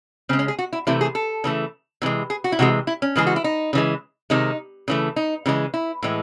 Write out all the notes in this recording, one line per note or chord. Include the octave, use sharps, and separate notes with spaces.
C#3 G#3 C4
C#4
G#4
F#4
E4
C3 E3 A3 E4
G#4
A4
C#3 E3 A3
C3 E3 G#3
G#4
F#4
E4
C3 E3 G#3 F#4
E4
C#4
C#3 E3 G#3 G#4
F#4
E4
D#4
C#3 E3 G#3
C3 D#3 G#3 D#4
C#3 E3 A3
D#4
C#3 E3 G#3
E4
A2 E3 G#3